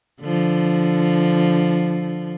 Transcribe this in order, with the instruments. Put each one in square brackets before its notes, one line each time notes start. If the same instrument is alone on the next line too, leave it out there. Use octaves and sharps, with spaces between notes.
[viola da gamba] D3 F3